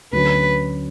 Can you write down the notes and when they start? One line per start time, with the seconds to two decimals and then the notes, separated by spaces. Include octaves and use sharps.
0.13 D2 D3 F#3 C#4 B4